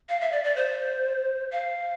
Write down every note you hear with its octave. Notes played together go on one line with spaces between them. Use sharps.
F5
E5
D5
D5
C5
F5